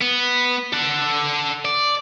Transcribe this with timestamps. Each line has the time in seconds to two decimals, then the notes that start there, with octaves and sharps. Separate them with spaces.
0.01 B3
0.73 A4 F#5
1.65 D5